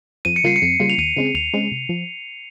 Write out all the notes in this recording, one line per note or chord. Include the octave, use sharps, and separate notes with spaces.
F2 D#7
C#7
C#3 G3 A#3 F4 C7
C#7
F2
C#3 G3 A#3 F4
F7
D#2 D#7
C#3 G#3 C4
D#2 F7
C#3 G#3 C4
C3
F3